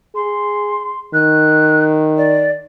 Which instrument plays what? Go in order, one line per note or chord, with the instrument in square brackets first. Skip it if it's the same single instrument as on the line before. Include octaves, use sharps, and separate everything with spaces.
[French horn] G#4 [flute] C6
[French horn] D#3 [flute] F#6
[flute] D5